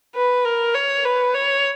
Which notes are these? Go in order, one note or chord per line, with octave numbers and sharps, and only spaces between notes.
B4
A#4
C#5
B4
C#5